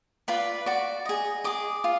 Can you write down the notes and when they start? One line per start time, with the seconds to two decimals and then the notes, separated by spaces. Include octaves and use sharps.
0.28 F4 B4 D5 B5
0.66 F#4 D5
1.05 G#4 D#5
1.44 G#4 D#5 D6
1.84 F4